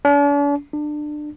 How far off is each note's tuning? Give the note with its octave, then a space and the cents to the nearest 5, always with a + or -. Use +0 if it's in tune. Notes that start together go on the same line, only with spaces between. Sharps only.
D4 -45
D4 +25